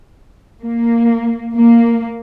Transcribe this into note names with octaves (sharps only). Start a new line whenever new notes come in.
A#3
A#3